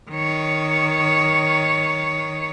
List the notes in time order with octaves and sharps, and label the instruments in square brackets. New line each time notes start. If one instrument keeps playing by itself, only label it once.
[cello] D#3 C#5